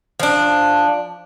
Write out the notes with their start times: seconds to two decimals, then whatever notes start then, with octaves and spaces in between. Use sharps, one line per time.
0.20 F3 D4